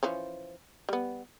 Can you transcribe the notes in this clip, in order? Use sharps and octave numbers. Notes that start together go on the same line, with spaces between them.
E3 F3 C#4
G3 B3